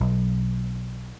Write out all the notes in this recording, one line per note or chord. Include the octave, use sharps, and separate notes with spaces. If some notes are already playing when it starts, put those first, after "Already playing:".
B1